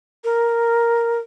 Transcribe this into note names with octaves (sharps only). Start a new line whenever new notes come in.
A#4